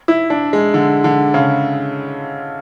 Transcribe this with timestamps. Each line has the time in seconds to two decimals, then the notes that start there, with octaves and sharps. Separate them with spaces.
0.08 E4
0.30 D4
0.53 G#3
0.74 D3
1.04 D3
1.34 C#3